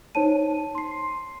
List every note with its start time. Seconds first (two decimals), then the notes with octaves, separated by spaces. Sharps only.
0.15 D#4 C5 C#5 A5 D#7
0.75 C6 C7